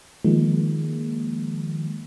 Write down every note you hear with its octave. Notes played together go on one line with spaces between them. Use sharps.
D#3 F3 G#3 A#3